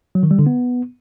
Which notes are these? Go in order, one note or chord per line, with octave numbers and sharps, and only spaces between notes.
F#3
D#3
G3
D3
B3